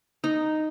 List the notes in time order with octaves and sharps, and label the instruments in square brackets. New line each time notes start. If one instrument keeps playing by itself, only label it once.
[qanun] D#4